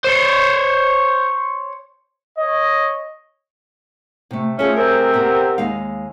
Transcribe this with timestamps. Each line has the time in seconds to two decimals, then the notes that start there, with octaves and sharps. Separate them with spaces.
0.05 C5 C#5
2.38 C#5 D#5
4.31 C3 A3
4.59 F3 A3 C#4 G#4 E5
4.76 C3 C4 A#4
5.14 B3 G4
5.58 D#2 G#3 F5